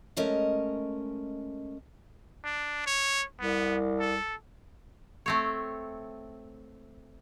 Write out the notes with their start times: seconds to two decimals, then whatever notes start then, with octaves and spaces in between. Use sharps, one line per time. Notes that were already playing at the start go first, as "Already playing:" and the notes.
0.17 G#3 A3 C#4 A#4 D#5
2.44 D4
2.86 C#5
3.40 C2 B3
3.99 A4
5.26 A3 C4 C#5